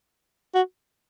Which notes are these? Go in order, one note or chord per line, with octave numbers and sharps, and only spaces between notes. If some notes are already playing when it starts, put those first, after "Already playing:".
F#4